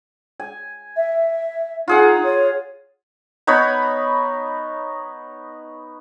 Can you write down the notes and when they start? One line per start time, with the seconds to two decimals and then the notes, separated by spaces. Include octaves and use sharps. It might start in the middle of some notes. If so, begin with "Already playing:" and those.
0.40 G#5
0.97 E5
1.88 D#4 F4 G#4 F#5
2.24 C#5
3.47 B3 D#4 C#5 B5